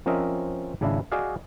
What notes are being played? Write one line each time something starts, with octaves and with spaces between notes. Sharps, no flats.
F3 C4 C#4 A#4 D#5 E5
G#1 C#3 D4 E4
F#4 G#4 D5 D#5 F5